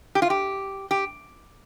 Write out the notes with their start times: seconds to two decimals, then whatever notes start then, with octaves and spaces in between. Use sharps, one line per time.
0.15 G4
0.22 F4
0.30 G4
0.91 G4